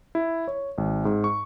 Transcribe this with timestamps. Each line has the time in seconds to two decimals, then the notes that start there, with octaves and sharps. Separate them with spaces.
0.15 E4
0.48 C#5
0.78 G#1
1.05 G#2
1.24 C#6